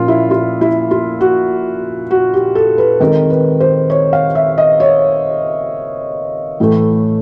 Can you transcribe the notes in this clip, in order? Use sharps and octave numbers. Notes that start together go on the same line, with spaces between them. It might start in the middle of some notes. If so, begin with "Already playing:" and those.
Already playing: A#2 F3 A#3 C#4 F4
E4
F4
E4
F4
F#4
F#4
G4
A4
B4
D#3 G#3 C4 A#4
B4
C5
C#5
F5
E5
D#5
C#5
A2 E3 A3